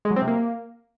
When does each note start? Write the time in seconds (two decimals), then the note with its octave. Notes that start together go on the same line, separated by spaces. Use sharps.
0.05 G#3
0.11 F#3
0.16 C4
0.22 C3
0.28 A#3